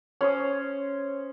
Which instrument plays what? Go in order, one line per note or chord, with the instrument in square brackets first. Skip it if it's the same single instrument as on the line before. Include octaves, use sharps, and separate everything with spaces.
[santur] C#4 C5 D#6